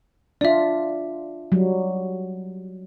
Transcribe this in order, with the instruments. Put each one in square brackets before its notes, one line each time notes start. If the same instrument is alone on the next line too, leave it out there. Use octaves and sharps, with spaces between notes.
[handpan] D4 F4 [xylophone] D5 E5
[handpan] F#3 G3